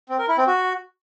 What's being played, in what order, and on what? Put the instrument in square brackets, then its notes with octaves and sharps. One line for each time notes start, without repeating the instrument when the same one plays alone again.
[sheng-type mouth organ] C4
A#4
E4
C4
F#4